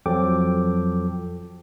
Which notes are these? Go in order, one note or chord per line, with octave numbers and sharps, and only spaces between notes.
F2 F3 F#3 A4 G5 D6